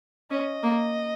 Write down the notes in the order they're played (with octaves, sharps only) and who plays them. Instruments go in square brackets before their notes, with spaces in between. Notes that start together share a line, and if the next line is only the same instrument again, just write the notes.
[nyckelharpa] C#4 [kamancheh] D#5
[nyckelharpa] A#3